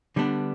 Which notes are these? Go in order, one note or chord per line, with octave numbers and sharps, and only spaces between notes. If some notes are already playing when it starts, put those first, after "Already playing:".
D3 G3 B3 D4